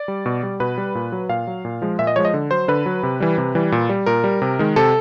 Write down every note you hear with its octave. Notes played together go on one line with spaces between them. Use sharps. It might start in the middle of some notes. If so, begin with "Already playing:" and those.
Already playing: D5
G3
B2
G3
B2 B4
G3
A#2
F#3
A#2 F5
F#3
A#2
F3 G#3
A#2 E5
D#5
F3 G#3 C#5
D#5
D3
F#3 C5
D3 B4
F#3
C3
E3 G3
C3
E3 G3
A#2
G3
A#2 A#4
G3
C3
D#3 G#3
C3 A4